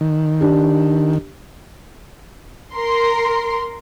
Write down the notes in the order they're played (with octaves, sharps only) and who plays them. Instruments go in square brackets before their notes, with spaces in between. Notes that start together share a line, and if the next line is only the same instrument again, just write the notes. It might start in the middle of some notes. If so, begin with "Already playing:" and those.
[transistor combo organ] D#3
[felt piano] D4 G4
[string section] A#4 C6